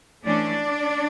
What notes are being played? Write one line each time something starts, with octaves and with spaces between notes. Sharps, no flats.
E3 A3 C#4 D4 D5